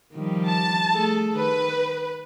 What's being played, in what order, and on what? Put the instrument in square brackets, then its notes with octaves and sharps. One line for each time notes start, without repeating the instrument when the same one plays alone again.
[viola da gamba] D#3 F3 G3
[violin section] A5
[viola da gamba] A3 G#4 A4
[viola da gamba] D#3 [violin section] B4